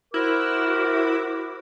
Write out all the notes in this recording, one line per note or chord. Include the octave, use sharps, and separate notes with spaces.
E4 F#4 A#4 C5 D6